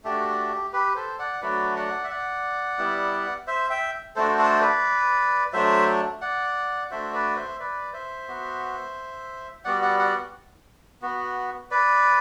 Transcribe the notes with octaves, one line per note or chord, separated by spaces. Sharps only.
A3 D4 F#4 G4
G4 B4
A4 C5
D5 F#5
F#3 A3 D4 F#4 B4 D5
D5 F#5
E5
D5 F#5
G3 B3 E4
C5 E5
E5 G5
A3 D4 F#4 A4 C5
A4 C5
B4 D5
F#3 A3 D4 C5 E5
D5 F#5
A3 D4 F#4 C5 E5
B4 D5
C5 E5
B4 D5
C5 E5
B3 F#4
G3 B3 F#4 D5 F#5
D5 F#5
D5 F#5
B3 F#4
B4 D5